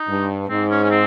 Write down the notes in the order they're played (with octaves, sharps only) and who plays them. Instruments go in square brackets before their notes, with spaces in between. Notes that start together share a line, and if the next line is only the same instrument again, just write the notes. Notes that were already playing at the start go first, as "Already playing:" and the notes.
Already playing: [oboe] D#4
[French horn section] G2
[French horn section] G#2 [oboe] C4
[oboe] C#4
C#4
C4